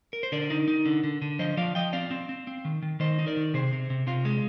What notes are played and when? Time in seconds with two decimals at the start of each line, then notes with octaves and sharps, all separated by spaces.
0.13 A#4
0.23 C5
0.32 D3 A#4 D5
0.50 D#4
0.68 D#4
0.86 D3
1.04 D3
1.22 D3
1.39 F3 C5 D#5
1.57 F3 D5 F5
1.75 F3 D#5 G5
1.93 C4 D5 F5
2.11 C4
2.29 C4
2.47 C4
2.65 D#3
2.82 D#3
3.00 D#3 C5 D#5
3.19 D#4
3.27 A#4 D5
3.37 D#3
3.54 C3 G#4 C5
3.72 C3
3.90 C3
4.07 C3 F4
4.25 G#3